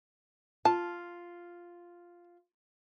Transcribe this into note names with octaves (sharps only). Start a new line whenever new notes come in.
F4 A5